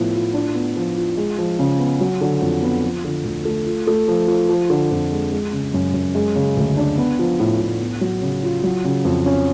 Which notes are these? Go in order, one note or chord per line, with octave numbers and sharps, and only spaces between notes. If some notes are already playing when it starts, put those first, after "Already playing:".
Already playing: A2 F3 B3
F4
D4
B3
F3
F4
G#3
F3
C#3
B3
F#3
D3
F2
B3
F3
D3
D2
A3
F4
A3
F3
F3
F3
D3
F2
G#3
G#3
C#3
F#2
F#2
G#3
C#3
D2
D4
B3
F3
A2
A2
B3
F#3
C#3
F4
F#3
C#3
F2
C#4